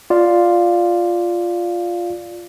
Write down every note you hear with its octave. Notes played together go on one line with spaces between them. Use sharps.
F4 D5 F5